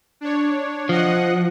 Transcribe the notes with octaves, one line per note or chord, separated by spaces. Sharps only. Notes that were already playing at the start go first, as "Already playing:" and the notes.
D4 C#5
F3 D#5 F#5